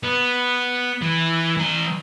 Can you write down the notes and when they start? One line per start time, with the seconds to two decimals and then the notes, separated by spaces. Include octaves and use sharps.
0.03 B3
1.02 E3
1.57 E3 A#5